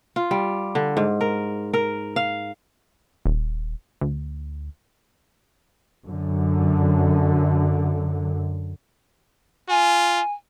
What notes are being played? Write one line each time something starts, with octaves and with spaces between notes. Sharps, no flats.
F4
G3
D3
G#2
A#4
A#4
F5
D#1
D2
F#2 D3
F4 G#5